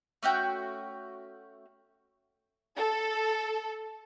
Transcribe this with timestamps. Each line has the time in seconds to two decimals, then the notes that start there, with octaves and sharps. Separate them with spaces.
0.23 A3 C#4 F#4 G5
2.77 A4